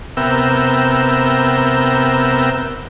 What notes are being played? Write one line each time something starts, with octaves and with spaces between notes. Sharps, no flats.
C3 B3 A#4 E5 G5 E6